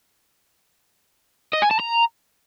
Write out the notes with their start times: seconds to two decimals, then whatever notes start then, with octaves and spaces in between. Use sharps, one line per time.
1.53 D#5
1.62 G#5
1.71 A5
1.80 A#5